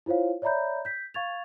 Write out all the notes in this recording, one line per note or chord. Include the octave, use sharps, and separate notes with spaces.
E4 F4 C5 C#5 F5
C#5 D5 E5 A#5 B5 G6
G6 B6
F5 C#6 G#6 A6 F7